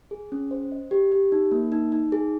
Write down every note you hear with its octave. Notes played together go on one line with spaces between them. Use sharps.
G#4
C#4
C5
D#5
G4
G4
D#4
A#3
D#4
D#4
G#4